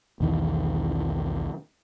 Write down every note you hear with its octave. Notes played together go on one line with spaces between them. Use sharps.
B1 E2 D#3 E3